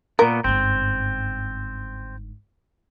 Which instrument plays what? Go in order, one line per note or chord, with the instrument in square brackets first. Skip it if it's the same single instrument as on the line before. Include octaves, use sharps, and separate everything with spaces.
[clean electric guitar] A#2 B3 [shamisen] A#4
[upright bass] G1 G#2 [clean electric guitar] C4